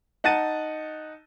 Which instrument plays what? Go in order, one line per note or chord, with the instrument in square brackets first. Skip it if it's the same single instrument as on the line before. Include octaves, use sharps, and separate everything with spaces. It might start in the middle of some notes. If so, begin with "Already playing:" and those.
[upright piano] D#4 F#5 A5 A6 D#7